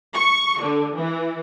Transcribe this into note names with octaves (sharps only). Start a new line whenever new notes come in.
C#6
D3
E3